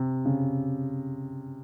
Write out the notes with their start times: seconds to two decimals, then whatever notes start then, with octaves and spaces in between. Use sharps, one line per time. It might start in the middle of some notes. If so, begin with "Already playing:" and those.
Already playing: C3
0.25 C#3